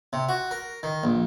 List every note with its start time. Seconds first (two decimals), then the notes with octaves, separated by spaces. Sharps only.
0.13 C3
0.29 F#4
0.51 A#4
0.83 D#3
1.04 A#1